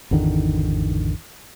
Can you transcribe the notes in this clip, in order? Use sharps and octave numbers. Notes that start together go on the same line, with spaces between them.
G#1 E2 D3 D#3